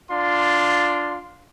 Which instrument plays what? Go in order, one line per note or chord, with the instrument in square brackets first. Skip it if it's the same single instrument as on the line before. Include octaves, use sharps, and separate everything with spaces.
[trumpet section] D4 F4 C6